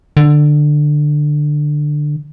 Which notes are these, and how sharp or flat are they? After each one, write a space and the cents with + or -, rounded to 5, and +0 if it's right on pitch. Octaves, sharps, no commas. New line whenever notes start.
D3 +15